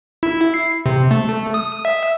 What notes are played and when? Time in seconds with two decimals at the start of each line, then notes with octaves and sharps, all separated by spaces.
0.23 E4
0.54 C7
0.86 C3
1.11 A3
1.54 D#6
1.85 E5